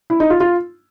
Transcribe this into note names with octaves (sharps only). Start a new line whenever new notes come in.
E4
D#4
F4
F4